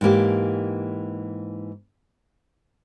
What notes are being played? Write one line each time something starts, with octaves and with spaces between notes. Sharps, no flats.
G#2 E3 A#3 G4